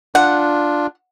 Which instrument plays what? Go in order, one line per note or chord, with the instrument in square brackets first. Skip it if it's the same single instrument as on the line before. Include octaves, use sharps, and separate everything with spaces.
[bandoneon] D4 F4 [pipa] F#5